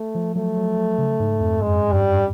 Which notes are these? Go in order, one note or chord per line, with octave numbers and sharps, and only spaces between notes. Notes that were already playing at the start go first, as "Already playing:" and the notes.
Already playing: A3
F3
F#3 A3
F#3
F#3
C#3
G#2
F2
F#2 G#3
G2 G3